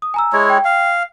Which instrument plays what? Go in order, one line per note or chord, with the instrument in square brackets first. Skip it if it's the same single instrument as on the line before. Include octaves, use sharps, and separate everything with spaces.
[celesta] D#6
G#5 A#5 E6
[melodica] G#3 E4 C#5
[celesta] G5
[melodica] F5